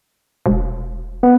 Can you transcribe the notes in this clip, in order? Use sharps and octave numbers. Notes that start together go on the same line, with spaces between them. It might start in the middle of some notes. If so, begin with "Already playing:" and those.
E1
B3